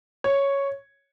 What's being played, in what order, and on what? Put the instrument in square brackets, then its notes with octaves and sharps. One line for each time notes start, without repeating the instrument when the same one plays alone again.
[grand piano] C#5